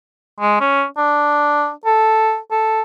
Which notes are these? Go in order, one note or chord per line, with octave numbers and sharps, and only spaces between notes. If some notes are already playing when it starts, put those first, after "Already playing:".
G#3
C#4
D4
A4
A4